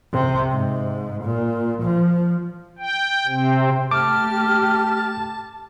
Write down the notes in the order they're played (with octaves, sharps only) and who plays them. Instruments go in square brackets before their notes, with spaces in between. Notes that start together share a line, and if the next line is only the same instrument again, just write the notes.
[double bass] C3
G#2
A#2
F3
[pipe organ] G5
C3 C4
[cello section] A3 G4 [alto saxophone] A5 [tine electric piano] D6 [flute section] F6